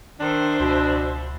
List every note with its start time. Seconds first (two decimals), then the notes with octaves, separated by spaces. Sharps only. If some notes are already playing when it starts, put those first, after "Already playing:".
0.20 D#3 D4 C5 E5
0.60 C#2 B2